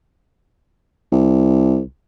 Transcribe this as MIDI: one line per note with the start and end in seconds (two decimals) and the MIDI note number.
1.12 1.81 36